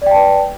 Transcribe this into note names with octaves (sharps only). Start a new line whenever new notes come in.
B4 D5 G5 A5